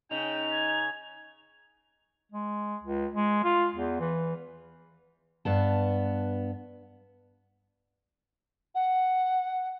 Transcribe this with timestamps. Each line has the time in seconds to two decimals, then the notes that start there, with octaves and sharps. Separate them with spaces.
0.11 C#3 D#4 G5 F7
0.52 G#6
2.32 G#3
2.83 C#2
3.15 G#3
3.44 F4
3.75 E2
4.00 E3
5.45 G2 B3 A5
8.75 F#5